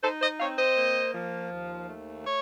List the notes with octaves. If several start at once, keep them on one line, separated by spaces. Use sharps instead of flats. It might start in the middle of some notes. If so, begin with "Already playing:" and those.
D#4 A4 C5
C5 D#5
C4 C#5 F5
C5 D#5
A#3
F3
D#2
A3
C#5